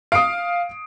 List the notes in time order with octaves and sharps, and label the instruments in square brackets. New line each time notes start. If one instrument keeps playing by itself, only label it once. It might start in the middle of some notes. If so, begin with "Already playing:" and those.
[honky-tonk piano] F5 [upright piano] D#6 C7 D7